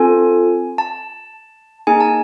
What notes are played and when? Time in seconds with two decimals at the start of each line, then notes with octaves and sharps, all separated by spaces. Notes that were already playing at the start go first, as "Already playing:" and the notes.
Already playing: C4 F4 A4 G#5
0.78 A5
1.87 A#3 D#4 G#4 G#5
2.00 A5